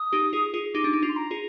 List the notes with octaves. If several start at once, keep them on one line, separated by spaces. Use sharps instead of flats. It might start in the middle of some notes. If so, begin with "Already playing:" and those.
Already playing: D#6
D#4 G4
F4 G#4
F4 G#4
D#4 G4 D6
D4
D#4
D4 F4
C6
A#5
F4 G#4